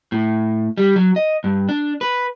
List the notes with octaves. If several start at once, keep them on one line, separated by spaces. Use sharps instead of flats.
A2
G3
F#3
D#5
G2
D4
B4